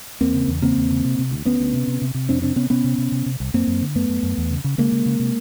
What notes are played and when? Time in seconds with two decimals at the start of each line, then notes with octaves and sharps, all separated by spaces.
0.21 E2 A#3 C4
0.34 C#3
0.48 E2
0.62 C#3 A#3 C4
0.77 E2
0.91 C#3
1.05 C3
1.19 C3
1.31 D2
1.45 D2 B3 C#4
1.60 D2
1.73 C3
1.88 C3
2.02 C3
2.14 C3
2.29 F2 C4 D4
2.42 C3 C4 D4
2.56 C3 B3 C#4
2.70 C3 B3 C#4
2.84 C3
2.98 C3
3.12 C3
3.26 C3
3.40 C2
3.54 F#2 A#3 C4
3.67 F#2
3.82 D3
3.95 F#2 A3 B3
4.09 F#2
4.23 F#2
4.38 E2
4.51 C#3
4.64 C#3
4.78 C#3 G#3 A#3
4.92 C#3
5.06 C#3
5.20 C3